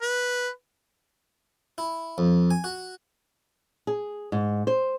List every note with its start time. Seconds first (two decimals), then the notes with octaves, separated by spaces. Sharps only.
0.02 B4
1.78 E4
2.18 F2
2.51 G#5
2.64 F#4
3.87 G#4
4.32 G#2
4.67 C5